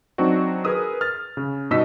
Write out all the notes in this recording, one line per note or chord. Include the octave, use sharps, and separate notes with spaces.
F#3 C4 D4 D#4 F#4
G#4 A#4 B4 D#6 E6
F6 A6
C#3
G2 B2 D#4 D#5 E6 B6